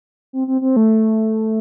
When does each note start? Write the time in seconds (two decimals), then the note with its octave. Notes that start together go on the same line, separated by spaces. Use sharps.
0.33 C4
0.48 C4
0.61 C4
0.76 A3